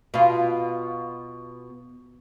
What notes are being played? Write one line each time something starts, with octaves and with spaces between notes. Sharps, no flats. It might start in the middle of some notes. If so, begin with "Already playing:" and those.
B2 F4